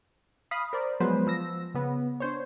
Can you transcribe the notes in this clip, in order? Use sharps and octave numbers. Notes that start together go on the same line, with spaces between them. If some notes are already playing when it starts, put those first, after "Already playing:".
F5 B5 D#6
A#4 C5 D5
F3 F#3 G#3 B3 B4 C5
F3 E6 A#6
C#3 B3
D4 C5 C#5